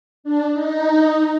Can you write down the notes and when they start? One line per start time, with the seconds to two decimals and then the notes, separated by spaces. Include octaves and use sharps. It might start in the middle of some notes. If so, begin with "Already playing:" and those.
0.24 D4
0.53 D#4